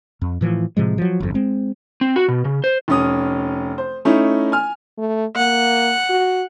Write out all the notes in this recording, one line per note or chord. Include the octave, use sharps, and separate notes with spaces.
F2
A2 E3 F3
A2 C3 F3 G#3
F3 F#3
G1 F2
G#3 C4
C4
F#4
B2
C#3
C5
F1 C#4 D#6
C5
A3 C#4 D#4 E4
G#5 F6
A3
A#3 F#5
F#4